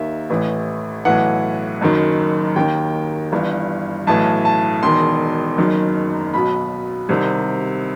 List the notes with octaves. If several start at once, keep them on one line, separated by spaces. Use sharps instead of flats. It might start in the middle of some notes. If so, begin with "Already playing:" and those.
Already playing: D#2 D#3 E5
A1 A2 E3
B1 A2 E3 F#5
F#1 F#2 D#3
D#2 D#3 G5
G1 G2 E3
B1 A2 E3 A5
A5
E1 E2 D#3 C6
F#1 F#2 D#3
B1 B2 B5
C2 C3 D#3